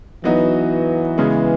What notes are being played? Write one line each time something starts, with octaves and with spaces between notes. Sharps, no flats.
E3 F#3 B3 D#4 F#4
C#3 G#3 B3